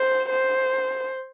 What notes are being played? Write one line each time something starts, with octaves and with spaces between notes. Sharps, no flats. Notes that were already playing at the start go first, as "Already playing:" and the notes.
Already playing: C5
C5